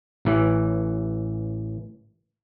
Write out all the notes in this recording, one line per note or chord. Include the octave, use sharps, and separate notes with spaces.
A1 E3